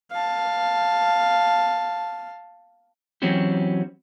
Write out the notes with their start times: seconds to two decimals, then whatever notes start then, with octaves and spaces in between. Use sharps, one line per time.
0.12 F5 A5
3.22 E3 F#3 C4 C#4 F#4 G4